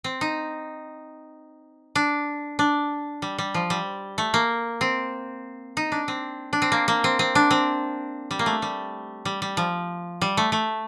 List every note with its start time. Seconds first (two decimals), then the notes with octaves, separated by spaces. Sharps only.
0.04 C4
0.21 D#4
1.95 D4
2.59 D4
3.22 G3
3.38 G3
3.54 F3
3.70 G3
4.18 A3
4.34 A#3
4.81 C4
5.77 D#4
5.92 D4
6.08 C4
6.53 D4
6.62 C4
6.72 A#3
6.88 A#3
7.04 C4
7.19 C4
7.35 D4
7.51 C4
8.31 G3
8.39 A#3
8.46 A3
8.62 G3
9.25 G3
9.42 G3
9.57 F3
10.21 G3
10.37 A3
10.52 A3